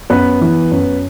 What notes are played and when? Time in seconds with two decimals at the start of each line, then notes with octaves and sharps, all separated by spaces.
0.10 F#2 B3 B4
0.41 E3
0.71 F#2